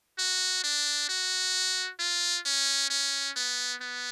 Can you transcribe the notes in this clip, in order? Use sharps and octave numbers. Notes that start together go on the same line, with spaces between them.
F#4
D4
F#4
F4
C#4
C#4
B3
B3